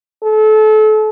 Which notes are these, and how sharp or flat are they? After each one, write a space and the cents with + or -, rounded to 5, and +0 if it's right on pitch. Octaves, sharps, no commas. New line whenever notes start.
A4 -30